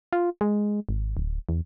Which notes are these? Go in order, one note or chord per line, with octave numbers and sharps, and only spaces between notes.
F4
G#3
G#1
D1
E2